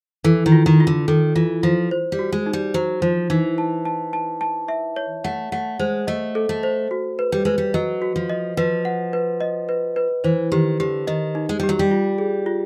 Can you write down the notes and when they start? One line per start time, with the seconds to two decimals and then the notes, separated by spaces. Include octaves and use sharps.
0.24 E3 A4
0.46 D#3
0.52 F4
0.66 D#3
0.80 F4
0.87 D3
1.08 D#3 A4
1.35 E3 F4
1.63 F3 F4
1.91 C5
2.12 G3
2.19 F#4
2.32 G#3
2.46 D#4
2.53 G3
2.74 F#3 C5
3.02 F3 C5
3.30 E3 D#4
3.58 A5
3.85 A5
4.13 A5
4.41 A5
4.68 E5
4.96 C#5
5.24 A3 F#5
5.52 A3 F#5
5.79 G#3 C5
6.07 A3 D#5
6.35 A4
6.49 A3
6.63 C5
6.91 F#4
7.19 B4
7.32 G3
7.45 G#3 B4
7.58 G3
7.74 F#3 D#5
8.02 F#4
8.16 F3
8.30 D#5
8.57 F3 B4
8.85 F#5
9.13 B4
9.41 D#5
9.69 B4
9.96 B4
10.24 E3 C5
10.52 D#3 G4
10.80 D3 G4
11.07 D#3 D#5
11.35 D#4
11.49 G#3
11.60 G3 G4
11.69 F#3
11.79 G3
11.91 F4
12.18 G#4
12.46 F4